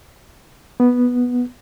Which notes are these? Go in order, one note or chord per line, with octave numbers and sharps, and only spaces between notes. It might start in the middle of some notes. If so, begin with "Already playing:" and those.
B3